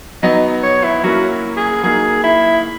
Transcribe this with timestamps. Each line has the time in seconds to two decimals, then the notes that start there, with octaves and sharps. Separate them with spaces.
0.23 F#3 B3 D#4 D#5
0.63 C#5
0.84 E4
1.03 F#3 A#3 C#4 E4 F#4
1.57 G#4
1.83 F#3 A#3 D#4 G#4
2.24 E4